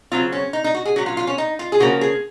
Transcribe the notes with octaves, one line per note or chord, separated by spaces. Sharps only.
C#3 F#3 C4 F4
C#4
D#4
D#4
F#4
G#4
A#2 F#3 C#4 F#4
F4
F4
C#4
D#4
F4
G#4
C#3 F3 A#3 C#4 F#4
G#4